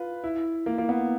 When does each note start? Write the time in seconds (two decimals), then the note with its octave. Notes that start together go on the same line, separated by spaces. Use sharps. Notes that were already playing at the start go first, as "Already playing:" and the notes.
Already playing: F4 B4
0.24 E4
0.66 A#3
0.78 A#3
0.89 B3